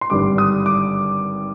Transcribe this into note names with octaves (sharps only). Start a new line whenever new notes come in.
C6
G#1 G2 D3 G3 D4 D6
D#6
D6